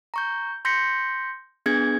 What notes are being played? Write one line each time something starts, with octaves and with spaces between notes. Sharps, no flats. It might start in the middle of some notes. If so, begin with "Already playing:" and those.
A#5 C#6 G6
C6 G6 A#6 B6 C#7
B3 D4 G#4 G#6